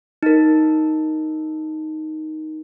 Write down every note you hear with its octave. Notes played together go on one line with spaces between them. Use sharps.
D#4 A#4